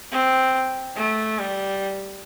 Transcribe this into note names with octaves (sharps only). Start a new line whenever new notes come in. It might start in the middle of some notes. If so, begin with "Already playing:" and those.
C4
A3
G3